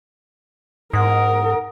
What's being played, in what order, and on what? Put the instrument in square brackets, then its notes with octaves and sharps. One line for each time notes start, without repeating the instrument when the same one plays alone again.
[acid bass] G#2 [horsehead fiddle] A#4 [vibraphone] F#5 D#6